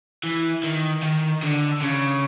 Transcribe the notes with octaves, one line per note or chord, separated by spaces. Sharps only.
E3
D#3
D#3
D3
C#3